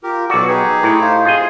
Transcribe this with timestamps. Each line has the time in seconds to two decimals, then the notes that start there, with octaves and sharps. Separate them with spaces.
0.03 F4 G4 A#4
0.30 B1 F#4 A4 D5 D6
0.48 D#4 G4 G#4 B4
0.83 A2 E4
1.01 C5 F5
1.26 C3 F4 G#4 D#5